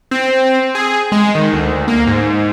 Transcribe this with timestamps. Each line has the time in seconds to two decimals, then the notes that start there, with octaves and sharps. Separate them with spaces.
0.11 C4
0.75 G#4
1.12 G#3
1.35 D#3
1.53 D2
1.88 A#3
2.07 G#2